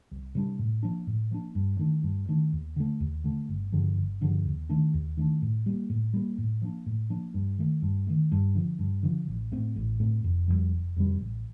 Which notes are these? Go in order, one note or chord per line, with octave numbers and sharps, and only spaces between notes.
C2
C3 G3 D4
A2
F3 A#3 D4
A2
F3 A#3 D4
G2
D#3 A3 D4
G2
D#3 A3 D4
D#2
D3 A3
D#2
D3 A3
G1
G2 D3 F3
G1
G2 D3 F3
D#2
D#3 A3 D4
D#2
D#3 A3 D4
A2
G3 A#3
A2
G3 A#3
A2
F3 A#3 D4
A2
F3 A#3 D4
G2
D#3 A3
G2
D#3 A3
G2
D3 F3
G2
D3 F3
A1
A2 A3 C4
A1
A2 A3 C4
F1
F2 C3 G3
F1
F2 C3 G3
A1